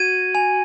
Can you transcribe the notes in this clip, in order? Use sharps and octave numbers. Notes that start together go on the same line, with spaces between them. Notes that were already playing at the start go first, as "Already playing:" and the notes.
Already playing: F#4 G#6 D#7
G#5